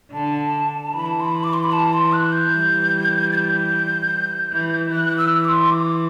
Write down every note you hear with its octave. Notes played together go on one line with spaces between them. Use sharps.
D3 A5
E3 B5
A5
C6
B5
D6
C6
B5
A5
C6
F#6
G6
E3 G3
A6
G6
E3
E3 F#6
E6
D6
C6
D6